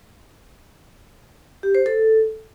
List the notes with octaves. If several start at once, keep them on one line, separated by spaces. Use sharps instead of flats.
G4
C5
A4